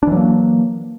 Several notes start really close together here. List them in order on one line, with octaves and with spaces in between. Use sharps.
D4 E3 F#3 A#3